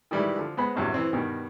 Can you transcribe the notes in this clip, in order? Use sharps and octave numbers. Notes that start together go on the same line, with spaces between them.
D#3 E3 G3 G#3 E4
D3 F3
G#3 B3 C5 B5
A#1 E2 G2 C3 F#3
E3 C4
G2 B2 D#3